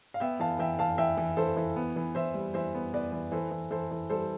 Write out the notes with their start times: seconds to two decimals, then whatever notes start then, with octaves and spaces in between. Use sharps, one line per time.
0.14 F5
0.20 B3 E5 G5
0.40 E3 F5 A5
0.59 E3 E5 G5
0.79 E3 F5 A5
0.98 E3 E5 G5
1.17 E3
1.37 E3 A4 C5
1.57 E3
1.76 B3
1.96 E3
2.15 E3 C5 E5
2.34 G3
2.54 E3 C5 E5
2.74 B3
2.93 B3 B4 D5
3.12 E3
3.32 E3 A4 C5
3.51 E3
3.71 E3 A4 C5
3.91 E3
4.10 G3 A4 C5